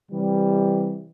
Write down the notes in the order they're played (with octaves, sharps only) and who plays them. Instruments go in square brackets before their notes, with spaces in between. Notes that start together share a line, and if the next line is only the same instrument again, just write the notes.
[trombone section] C3 E3 G3